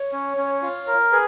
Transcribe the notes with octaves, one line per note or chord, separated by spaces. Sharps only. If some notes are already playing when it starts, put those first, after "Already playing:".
Already playing: C#5
C#4
C#4
F4
A#4
G#4 B4